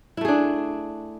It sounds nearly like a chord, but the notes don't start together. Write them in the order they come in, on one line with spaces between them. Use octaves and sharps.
E4 A3 G#4 D4